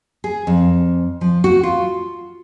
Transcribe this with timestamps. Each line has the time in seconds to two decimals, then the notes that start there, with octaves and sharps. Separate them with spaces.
0.24 G#4
0.47 F2
1.21 F3
1.44 F#4
1.63 F4